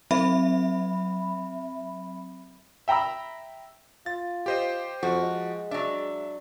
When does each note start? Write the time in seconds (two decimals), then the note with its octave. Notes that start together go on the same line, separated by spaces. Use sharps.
0.11 F#3 C4 E5 B5
2.88 E5 G5 A#5 B5 E6
4.06 F4 A6
4.46 G4 C5 D#5
5.03 F2 F3 F#4
5.22 G#3
5.71 F#3 D4 E5